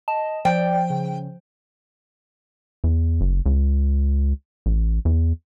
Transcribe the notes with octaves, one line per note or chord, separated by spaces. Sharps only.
D#5 A5
F3 D5 G5
C#3
E2
F#1
C#2
A1
E2